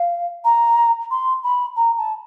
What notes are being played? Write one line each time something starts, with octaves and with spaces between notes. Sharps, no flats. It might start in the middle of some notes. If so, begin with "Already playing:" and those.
Already playing: F5
A#5
C6
B5
A#5
A5